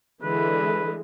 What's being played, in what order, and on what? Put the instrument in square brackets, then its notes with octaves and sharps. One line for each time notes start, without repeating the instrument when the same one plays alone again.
[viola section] D3 E3 G#3 [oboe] B4